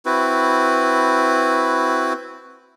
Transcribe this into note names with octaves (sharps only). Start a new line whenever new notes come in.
C4 E4 F#4 B4